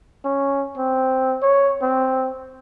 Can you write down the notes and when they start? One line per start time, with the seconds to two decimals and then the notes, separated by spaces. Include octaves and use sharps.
0.25 C#4
0.78 C4
1.42 C#5
1.82 C4